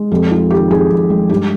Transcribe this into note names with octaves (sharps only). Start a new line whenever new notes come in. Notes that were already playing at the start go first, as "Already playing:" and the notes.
Already playing: G#3
F2 G4
G#3 F4
D#3 G4
F2 G#4
F2
G#3
G2 G4